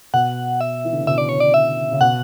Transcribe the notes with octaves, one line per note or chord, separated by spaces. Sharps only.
B2 F#5
E5
E3
D3
C#3
B2 E5
D5
C#5
D5
E5
C#3
B2 F#5